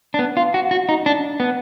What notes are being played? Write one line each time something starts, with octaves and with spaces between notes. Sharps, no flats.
D4
B3
F4
F#4
F#4
D#4
D4
B3